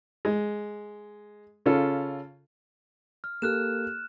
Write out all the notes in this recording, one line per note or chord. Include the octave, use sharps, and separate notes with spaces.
G#3
C#3 C#4 F4 A4
F6
A#3 G4 A4 F6 F#6 E7